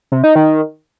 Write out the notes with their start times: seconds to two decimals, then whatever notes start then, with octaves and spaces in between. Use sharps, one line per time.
0.12 C3
0.24 D#4
0.35 D#3